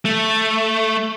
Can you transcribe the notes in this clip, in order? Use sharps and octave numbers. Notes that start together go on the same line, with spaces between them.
A3